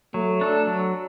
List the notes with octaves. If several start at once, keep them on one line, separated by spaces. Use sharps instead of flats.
F#3 A3
D4 A4
F#3